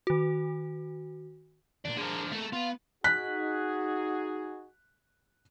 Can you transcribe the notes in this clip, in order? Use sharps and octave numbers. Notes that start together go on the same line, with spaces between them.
D#3 F#4
D#2 A#2 D4
D3 F3 G#4 A#4
A3 A#3 A4
B3 F4
D#4 F#4 G#4 F#6 B6